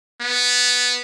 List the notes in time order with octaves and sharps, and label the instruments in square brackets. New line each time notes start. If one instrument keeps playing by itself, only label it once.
[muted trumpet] B3